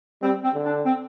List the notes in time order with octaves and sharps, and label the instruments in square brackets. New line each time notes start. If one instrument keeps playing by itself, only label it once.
[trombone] G3 [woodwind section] C4
[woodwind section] C4
[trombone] D3
[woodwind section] D4
C4